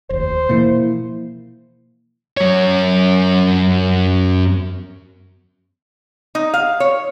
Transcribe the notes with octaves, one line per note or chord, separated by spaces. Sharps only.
F1 D#2 C5
B2 E3 F3 A#3 E4
F#2 C#5
D#4
F5
C#5